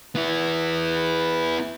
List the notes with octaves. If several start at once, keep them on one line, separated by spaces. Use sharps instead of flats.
B3 E4